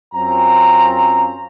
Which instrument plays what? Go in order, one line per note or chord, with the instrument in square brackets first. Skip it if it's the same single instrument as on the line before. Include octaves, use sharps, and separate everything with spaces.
[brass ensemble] F#2 C4 C#4 F4 A#5